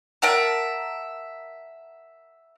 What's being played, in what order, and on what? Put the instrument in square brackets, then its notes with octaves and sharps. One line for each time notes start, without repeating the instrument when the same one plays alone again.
[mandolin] A#4 E5 F#5 A5